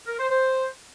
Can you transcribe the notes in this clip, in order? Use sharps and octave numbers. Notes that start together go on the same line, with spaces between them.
A#4
C5
C5